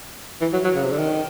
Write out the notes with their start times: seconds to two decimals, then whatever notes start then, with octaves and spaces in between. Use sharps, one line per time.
0.41 E3
0.53 F#3
0.64 F#3
0.75 C#3
0.83 C3
0.91 D3
0.99 D#3